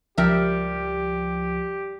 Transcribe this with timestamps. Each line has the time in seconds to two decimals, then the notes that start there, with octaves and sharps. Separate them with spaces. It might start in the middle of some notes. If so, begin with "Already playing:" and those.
0.18 C#2 F3 G3 G4 A#4 E5